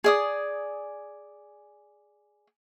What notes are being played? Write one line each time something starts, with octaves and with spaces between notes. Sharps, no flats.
G#4 D5 D#6